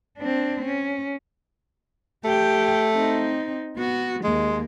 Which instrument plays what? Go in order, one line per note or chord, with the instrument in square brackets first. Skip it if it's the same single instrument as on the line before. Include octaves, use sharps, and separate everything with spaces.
[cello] C4 D4
C#4
[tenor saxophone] A3 [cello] G4 G5
[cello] C4 D#4
B3 F#4
[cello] D#2 A#3 [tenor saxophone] G#3